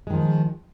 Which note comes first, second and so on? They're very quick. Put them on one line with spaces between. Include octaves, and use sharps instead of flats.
G#3 D#3 F3